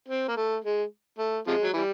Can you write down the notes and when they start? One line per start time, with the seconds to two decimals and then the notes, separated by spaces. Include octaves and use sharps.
0.08 C4
0.28 A#3
0.37 A3
0.64 G#3
1.18 A3
1.47 C3 F3 G#3
1.63 F#3
1.74 E3 G3